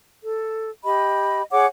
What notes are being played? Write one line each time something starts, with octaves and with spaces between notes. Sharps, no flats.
A4
G4 D#5 B5
G#4 C#5 F#5 D6